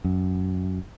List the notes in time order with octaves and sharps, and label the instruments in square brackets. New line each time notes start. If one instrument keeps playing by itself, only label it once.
[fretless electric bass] F#2